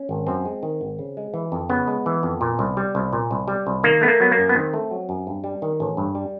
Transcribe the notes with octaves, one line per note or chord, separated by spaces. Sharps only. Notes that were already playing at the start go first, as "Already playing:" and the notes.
Already playing: C#4
G#1
F#2 C4
G#3
D#3
G#1
C#3
G#3
E3
F2
C#3 B3
G#3
E3
F2
A#2
C2
G3
C2
A#2
C2
G3
C2
D#3 A#3
A3 B3
A#3
F#3 B3
A#3
F#2
B3
D#3 C4
A3
F#3
F#2
G2
G3
D#3
A1
G2
G3